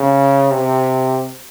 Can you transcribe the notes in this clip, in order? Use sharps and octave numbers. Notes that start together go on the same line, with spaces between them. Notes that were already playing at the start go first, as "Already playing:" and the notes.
Already playing: C#3
C3